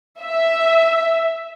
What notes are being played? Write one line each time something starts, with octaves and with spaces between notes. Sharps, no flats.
E5